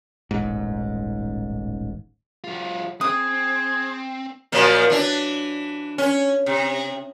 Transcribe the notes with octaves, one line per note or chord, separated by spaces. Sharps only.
D#1 A1 G#2
F#3 F4
C4 G#4 D#6
A#2 F3 F#3
E3 D4
C#4
C3